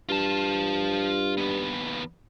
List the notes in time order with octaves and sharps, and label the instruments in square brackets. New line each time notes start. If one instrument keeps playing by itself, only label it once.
[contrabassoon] G2 [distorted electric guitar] F4 A5
[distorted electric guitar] D#2 B3